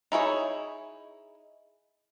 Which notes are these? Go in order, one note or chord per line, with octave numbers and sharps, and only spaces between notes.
D#4 E4 G#4 C#5